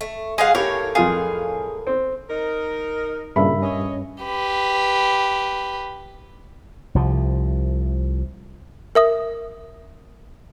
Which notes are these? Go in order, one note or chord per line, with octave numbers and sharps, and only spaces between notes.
A3
G#3 F4 G#4 F5 F#5
A2 G4 A4 A#4 C#5
F2 F4 G#4 F5
C4
D#4 A#4
G2 A#2 C#3 A#4 E5 B5
C#4 C#5 D#5
G4 B4
C2 F3
A#4 E5 D#6